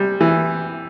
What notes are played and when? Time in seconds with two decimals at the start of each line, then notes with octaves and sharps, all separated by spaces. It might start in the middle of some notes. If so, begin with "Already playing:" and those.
Already playing: C3 G3
0.21 E3